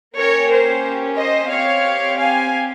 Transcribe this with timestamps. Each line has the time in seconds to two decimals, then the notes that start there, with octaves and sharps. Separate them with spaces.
0.16 A#3 C#4 G4 A#4 C#5
0.50 C5
1.17 C5 D#5
1.50 C4 G4 C#5 F5
2.18 F5 G#5